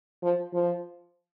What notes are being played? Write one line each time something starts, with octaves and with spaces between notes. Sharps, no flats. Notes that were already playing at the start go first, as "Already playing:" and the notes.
F3
F3